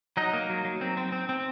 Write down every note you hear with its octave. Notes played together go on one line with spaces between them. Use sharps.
F#3 D#4 D#5
A#3
F#3
F#3
C4
C4
C4
C4